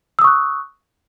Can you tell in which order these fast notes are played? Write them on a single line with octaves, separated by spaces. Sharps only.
E6 D#6 C#6 F#6